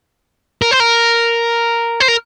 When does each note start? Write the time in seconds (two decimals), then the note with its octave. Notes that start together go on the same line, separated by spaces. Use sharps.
0.62 A#4
0.71 C5
0.80 A#4
2.00 C5
2.08 A#4